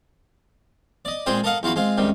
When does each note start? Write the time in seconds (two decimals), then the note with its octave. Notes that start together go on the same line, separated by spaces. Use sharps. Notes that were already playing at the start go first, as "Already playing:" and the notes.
1.05 D5 D#5
1.26 A#2 G#3 C4 G#4 C5 G5
1.44 A4 A#4 D#5 F5 F#5
1.63 E2 F4 F#4 F5 B5
1.76 G#3 C4 F4
1.97 C#2 C3 D#3 G3